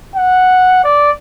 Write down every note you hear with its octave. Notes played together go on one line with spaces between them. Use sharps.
F#5
D5